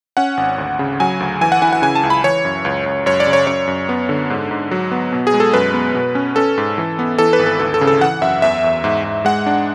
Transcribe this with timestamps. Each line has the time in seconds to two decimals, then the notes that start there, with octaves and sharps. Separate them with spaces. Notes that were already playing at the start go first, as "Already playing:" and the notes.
0.17 C#4 F#5
0.37 G#1
0.58 D2
0.79 C#3
1.00 F#3 G#5
1.20 D2
1.41 E3 G#5
1.52 F#5
1.62 E4 G#5
1.73 F#5
1.82 C#3 G#5
1.95 A5
2.03 C#2
2.10 B5
2.24 E3 C#5
2.45 F#2
2.65 C#2
2.86 C#2
3.06 F#2 C#5
3.20 D5
3.27 C#3
3.33 C#5
3.47 F#2 C#5
3.67 F#2
3.89 B3
4.09 D3
4.30 G#2
4.51 G#2
4.71 F#3
4.92 B3
5.12 B2
5.27 G#4
5.34 G#3
5.40 A4
5.54 F#2 B4
5.74 B3
5.95 B2
6.15 C#4
6.36 C#4 A4
6.58 G#2
6.78 E3
6.99 B3
7.18 E3 A4
7.33 B4
7.39 G#1
7.46 A4
7.60 D2 A4
7.74 A4
7.81 C#3
7.87 A4
8.01 E3 F#5
8.22 F#2 E5
8.42 E2 E5
8.64 E2
8.84 G#2
9.04 G#2
9.25 G#3 F#5
9.46 D4